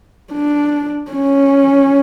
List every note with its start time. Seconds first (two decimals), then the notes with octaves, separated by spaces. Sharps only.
0.33 D4
1.11 C#4